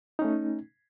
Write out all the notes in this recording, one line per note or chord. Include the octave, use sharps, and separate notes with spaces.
A3 C#4 D#4